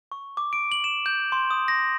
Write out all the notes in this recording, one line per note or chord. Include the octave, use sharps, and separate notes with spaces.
C#6
D6
D7
F#7
E7
G6
C6
D#6
A#6